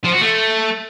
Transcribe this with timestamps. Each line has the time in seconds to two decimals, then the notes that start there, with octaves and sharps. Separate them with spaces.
0.04 F3
0.13 F#4
0.21 A3